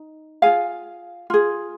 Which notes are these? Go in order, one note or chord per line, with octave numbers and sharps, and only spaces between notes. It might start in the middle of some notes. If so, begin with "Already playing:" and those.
Already playing: D#4
F4 G#4 F5 G#5
F4 G#4